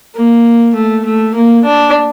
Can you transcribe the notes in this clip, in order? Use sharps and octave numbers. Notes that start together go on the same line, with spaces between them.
A#3
A3
A3
A#3
D4